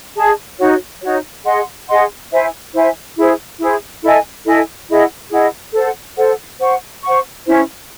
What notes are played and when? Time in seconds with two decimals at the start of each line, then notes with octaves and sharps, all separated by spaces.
0.16 G#4 D#5 A5
0.59 D#4 F#4 C#5
1.02 D#4 F#4 C#5
1.45 G#4 D#5 F#5 C6
1.88 G#4 D#5 F#5 C6
2.31 E4 C5 E5 G#5
2.73 E4 C5 E5 G#5
3.16 E4 G#4 C5
3.59 E4 G#4 C5
4.02 E4 A4 D#5 G#5
4.45 E4 A4 D#5 G#5
4.88 E4 G#4 D#5 F#5
5.31 E4 G#4 D#5 F#5
5.73 A4 C5 F#5
6.16 A4 C5 F#5
6.59 C5 F#5 C#6
7.03 C5 F#5 C#6
7.45 C#4 E4 C5